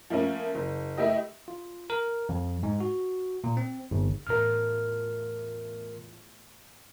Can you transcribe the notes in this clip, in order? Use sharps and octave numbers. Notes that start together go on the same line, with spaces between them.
F3 A3 A#3 C#4
F#1
A3 E4 G4 D#5
F4
A#4
F2
G#2
F#4
A#2
C4
G1
E2 A2 F4 A#4 F6